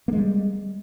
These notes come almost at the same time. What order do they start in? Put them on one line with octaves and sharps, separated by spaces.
A#3 G#3 G3